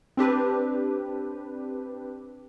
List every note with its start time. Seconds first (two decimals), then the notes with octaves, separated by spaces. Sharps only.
0.17 C4 D4 G4 B4